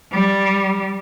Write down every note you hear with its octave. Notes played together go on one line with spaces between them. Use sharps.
G3